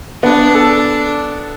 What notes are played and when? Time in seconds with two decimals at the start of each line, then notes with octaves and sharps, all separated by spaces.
0.23 B3 D4
0.55 A4